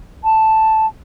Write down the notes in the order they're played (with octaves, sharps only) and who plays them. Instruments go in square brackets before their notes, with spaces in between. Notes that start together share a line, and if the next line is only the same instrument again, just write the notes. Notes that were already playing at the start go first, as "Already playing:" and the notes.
[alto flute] A5